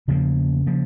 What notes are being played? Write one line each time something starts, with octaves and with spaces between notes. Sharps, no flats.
E2 C#3 F3 A#3
C#3 F3 A#3